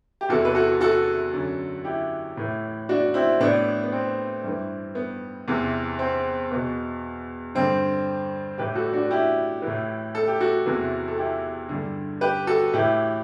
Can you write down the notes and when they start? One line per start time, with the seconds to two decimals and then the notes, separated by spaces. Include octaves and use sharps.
0.21 G4
0.29 E2 C3 E3 F#4 A4
0.45 B4
0.55 F#4 A4
0.81 F#4 A4
1.33 F#2 D3
1.85 E4 G4
2.37 A2 E3
2.89 D4 F#4
3.14 C4 E4
3.40 A2 E3 B3 D4
3.84 B3
3.92 C4
4.44 G2 E3
4.95 B3
5.48 E2 C3 E3
5.99 C4
6.51 E2 B2 B3
7.55 G2 D3 C4
8.58 A2 E3 G4 B4
8.75 F#4 A4
8.93 D4 F#4
9.11 E4 G4
9.62 E3
9.67 A2
10.15 A4
10.27 G4
10.40 F#4 A4
10.66 E2 C3 E3
11.08 A4
11.18 E4 G4
11.69 G2 D3
12.21 G4 B4
12.47 F#4 A4
12.73 A2 E3 E4 G4